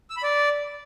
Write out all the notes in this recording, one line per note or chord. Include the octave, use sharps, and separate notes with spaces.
E6
B5
D5